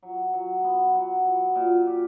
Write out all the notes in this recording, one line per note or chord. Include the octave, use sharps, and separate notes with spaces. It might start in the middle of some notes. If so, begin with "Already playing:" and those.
F#3
F#3
B3
F#3
F#3
A#2
G4